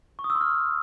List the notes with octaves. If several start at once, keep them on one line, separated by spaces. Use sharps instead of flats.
C#6
D#6
E6
C6
F6